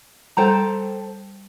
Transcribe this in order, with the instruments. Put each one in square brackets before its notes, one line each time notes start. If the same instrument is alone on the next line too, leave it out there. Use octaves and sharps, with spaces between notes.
[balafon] G3 [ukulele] A4 C5 G5 A#5